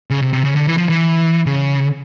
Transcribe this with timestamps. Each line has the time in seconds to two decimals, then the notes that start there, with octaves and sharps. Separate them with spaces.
0.10 C#3
0.22 C3
0.33 C3
0.44 C#3
0.56 D3
0.67 E3
0.78 F3
0.89 E3
1.46 C#3